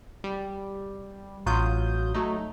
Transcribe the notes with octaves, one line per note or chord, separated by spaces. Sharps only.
G3
A1 F#3 F4 D#6 G6
F#3 A3 D#4